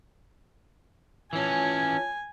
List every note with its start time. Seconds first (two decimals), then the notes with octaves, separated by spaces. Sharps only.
1.33 E3 C#4 F4 C#5 G#5 A5